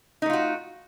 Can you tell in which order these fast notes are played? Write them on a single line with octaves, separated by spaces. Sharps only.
D#4 A3 F4 F#4